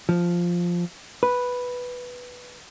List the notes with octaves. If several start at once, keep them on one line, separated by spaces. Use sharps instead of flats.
F3
B4